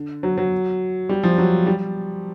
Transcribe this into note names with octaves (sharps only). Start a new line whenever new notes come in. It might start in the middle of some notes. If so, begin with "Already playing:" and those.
Already playing: D3
F#3
F#3
G3
F3
F#3
G3